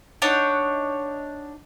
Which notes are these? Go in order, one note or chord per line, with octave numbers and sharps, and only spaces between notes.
D4 D#4 C#5 F#5